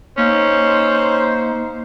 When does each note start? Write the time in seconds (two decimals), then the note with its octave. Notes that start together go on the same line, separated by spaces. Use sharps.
0.18 A#3 C#4 D#4 C5